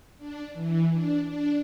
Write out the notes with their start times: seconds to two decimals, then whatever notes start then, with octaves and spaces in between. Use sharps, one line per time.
0.18 D4
0.53 E3
0.91 D4
1.27 D4